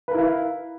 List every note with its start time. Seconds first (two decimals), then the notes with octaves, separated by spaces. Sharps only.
0.08 B4
0.11 A#4
0.14 E4
0.18 F5